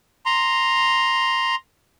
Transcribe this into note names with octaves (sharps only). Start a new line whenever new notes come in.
A#5 C6